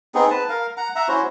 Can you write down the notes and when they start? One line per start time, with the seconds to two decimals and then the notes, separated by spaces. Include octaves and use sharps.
0.15 B3 C4 D#4 G#4
0.30 B4 A5
0.49 A#4 F5
0.77 F#5 A#5
0.96 E5 F#5 A#5
1.08 C#4 E4 F#4 C5